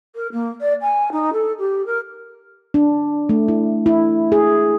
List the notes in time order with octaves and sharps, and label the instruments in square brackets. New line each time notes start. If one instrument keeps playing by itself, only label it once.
[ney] A#4
A#3
D5
G#5
D#4
A4
G4
A#4
[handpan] D4
A3
E4
E4
G#4